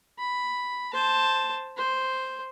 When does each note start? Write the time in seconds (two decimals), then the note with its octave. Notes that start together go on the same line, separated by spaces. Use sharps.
0.19 B5
0.93 C5 A5
1.77 C5